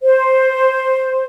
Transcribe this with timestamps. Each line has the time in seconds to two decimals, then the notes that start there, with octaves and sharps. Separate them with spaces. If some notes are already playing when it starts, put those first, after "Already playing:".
0.02 C5